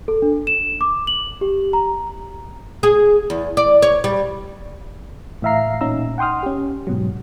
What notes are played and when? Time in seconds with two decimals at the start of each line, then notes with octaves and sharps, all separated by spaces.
0.08 A4
0.22 D4
0.47 E7
0.81 D6
1.07 F#7
1.41 G4
1.73 A#5
2.83 G#4
3.30 E2
3.57 D5
3.82 C#5
4.04 G3
5.42 A2 E3 E5 F5 A#5 C7
5.81 A#2 C#4 D#4 A#5 E6
6.18 F#5 G5 C6 D#6 F6
6.43 C#4 G4
6.87 G#2 B2 F#3